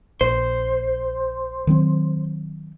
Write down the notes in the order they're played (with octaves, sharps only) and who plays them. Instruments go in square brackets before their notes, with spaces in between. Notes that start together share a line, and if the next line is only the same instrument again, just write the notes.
[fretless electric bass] A#1 [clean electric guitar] C5
[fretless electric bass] D#3 F#3 C4